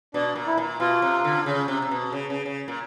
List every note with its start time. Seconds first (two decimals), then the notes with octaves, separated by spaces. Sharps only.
0.14 B2 D4
0.35 A#2
0.47 E4
0.58 A#2
0.80 B2 F4
1.02 C3
1.24 D3
1.46 C#3
1.68 C3
1.82 C3
1.91 B2
2.12 C#3
2.30 C#3
2.46 C#3
2.68 A#2